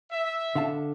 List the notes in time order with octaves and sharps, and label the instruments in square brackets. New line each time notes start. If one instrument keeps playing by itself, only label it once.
[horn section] E5
[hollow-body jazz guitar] D3 F5 A5